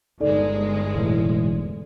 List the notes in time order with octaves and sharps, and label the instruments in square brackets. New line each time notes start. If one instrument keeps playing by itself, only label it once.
[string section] G1 G#3 [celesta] D#4 A4 D5
[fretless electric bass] E1 E2 A2